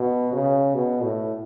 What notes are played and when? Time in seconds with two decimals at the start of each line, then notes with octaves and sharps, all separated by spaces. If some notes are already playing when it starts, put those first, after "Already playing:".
Already playing: B2
0.32 C#3
0.75 B2
1.03 A2